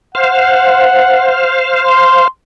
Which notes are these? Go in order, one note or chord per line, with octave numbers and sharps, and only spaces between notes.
C5 F5 F#5
C6